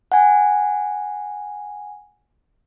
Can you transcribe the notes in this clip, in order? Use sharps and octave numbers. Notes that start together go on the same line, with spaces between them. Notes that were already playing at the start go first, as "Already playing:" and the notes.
F#5 G#5